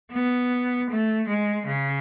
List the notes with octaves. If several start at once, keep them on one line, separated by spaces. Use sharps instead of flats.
B3
A3
G#3
C#3